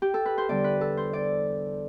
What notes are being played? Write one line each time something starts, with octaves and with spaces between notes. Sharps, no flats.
G4
A4
B4
C5
E2 D3 G3 D5
B4
A4
C5
D5